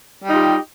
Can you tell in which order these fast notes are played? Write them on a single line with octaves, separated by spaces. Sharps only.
G3 D#4 F4 G4